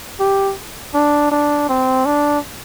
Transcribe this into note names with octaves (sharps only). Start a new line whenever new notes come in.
G4
D4
D4
C4
D4